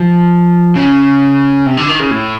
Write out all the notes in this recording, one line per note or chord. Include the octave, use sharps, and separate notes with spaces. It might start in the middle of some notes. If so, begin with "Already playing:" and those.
Already playing: F3
C#3
C3
D3
D#3
C#3
A2